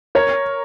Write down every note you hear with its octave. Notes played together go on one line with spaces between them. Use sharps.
A#4 C#5